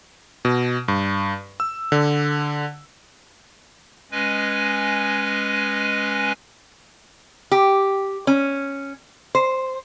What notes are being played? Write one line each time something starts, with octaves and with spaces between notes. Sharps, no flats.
B2
G2
E6
D3
G#3 C#4 B4 D#5 G#5
G4
C#4
C5